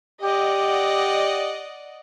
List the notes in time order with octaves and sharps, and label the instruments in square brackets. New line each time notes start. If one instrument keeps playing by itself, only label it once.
[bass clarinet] G4 [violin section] D5 D#5 F#5